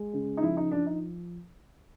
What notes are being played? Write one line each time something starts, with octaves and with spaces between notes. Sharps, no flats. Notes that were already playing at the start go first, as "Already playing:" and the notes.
Already playing: G#3
C#3
D#4
F3 E4
D#4
F3 D4
D#4